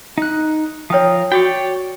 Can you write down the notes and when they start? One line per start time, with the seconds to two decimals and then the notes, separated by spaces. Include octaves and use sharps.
0.18 D#4 F#6
0.90 F3 A#4 C#5 G5 D#6
1.32 F#4 C#5 D5 G5